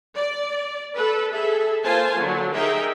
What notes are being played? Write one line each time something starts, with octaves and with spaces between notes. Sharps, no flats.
D5
A4 B4
G#4 A4 E5
A#3 F4 C5 G#5 A5
D3 F#3
D#4 G#4 A#4 D#5 E5 G5